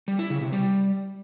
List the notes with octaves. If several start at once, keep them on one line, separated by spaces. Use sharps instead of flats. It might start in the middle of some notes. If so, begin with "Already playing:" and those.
G3
E4
C#3
C3
G3